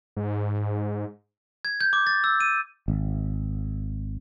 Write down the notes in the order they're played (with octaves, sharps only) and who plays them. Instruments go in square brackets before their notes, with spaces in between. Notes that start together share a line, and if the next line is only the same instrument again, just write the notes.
[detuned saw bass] G#2
[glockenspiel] G#6
G6
D6
A6
E6
D#7
[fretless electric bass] G#1